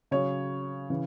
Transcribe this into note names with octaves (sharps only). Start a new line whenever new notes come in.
C#3 F#3 C#5
C#3 E3